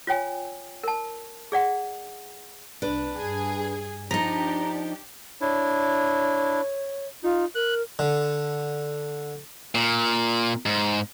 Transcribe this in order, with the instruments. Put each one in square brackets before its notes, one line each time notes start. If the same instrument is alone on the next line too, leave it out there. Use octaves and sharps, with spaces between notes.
[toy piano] F4 C#5 G5 G#5
A#4 A5
G#4 D5 F#5
[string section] C2 [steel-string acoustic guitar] D4 B4
[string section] G2 G#4 G#5
[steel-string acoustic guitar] F3 D#4 [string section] D4 G4 [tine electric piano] A#5
[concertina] D4 E4 [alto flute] C#5
[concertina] D#4 [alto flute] F4
[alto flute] A#4 [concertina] F#6
[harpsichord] D3
[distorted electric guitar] A#2
G#2